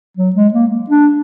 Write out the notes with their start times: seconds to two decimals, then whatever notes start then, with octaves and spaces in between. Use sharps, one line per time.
0.17 F#3
0.35 G#3
0.54 A#3
0.89 D4